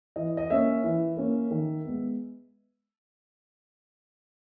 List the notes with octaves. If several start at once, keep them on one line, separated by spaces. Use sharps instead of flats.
E3 D#5
D#5
A#3 C#4 E5
E3
A#3 C#4
D#3
G#3 B3